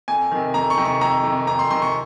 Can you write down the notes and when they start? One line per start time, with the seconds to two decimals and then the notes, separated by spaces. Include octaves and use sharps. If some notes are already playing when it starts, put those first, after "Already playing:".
0.08 F2 G#5
0.31 C3 D#3
0.54 F2 A#5
0.70 C#6
0.78 C3 D#3
0.85 C#6
1.01 F2 A#5
1.23 C3 D#3
1.47 F2 A#5
1.59 C6
1.70 C3 D#3 C6
1.82 C#6